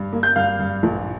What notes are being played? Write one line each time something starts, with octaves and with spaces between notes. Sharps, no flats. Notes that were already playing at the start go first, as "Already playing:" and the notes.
Already playing: G2
A#3
G6
G2 F5 F6
G2
A#1